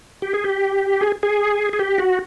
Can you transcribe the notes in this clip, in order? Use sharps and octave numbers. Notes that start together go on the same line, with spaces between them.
G4
G#4
G4
G#4
G#4
G#4
G4
F#4